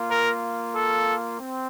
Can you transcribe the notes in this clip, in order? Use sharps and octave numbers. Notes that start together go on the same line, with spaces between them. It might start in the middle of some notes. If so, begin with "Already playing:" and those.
Already playing: A#3 F4
A#4
A4
C4